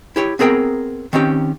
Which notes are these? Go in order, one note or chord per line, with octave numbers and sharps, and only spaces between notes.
E4 G4 C#5
B3 C4 G#4 A#4 G5 A#5
D#3 C4 C#4 G4